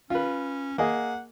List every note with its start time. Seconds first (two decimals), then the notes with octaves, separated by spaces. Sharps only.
0.10 C#4 F4 B4
0.78 A#3 G#4 D#5 F#5